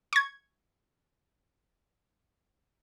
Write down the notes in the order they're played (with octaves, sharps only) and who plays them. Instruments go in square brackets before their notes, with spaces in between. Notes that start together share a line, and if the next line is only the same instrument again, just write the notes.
[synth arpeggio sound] C#6 G#6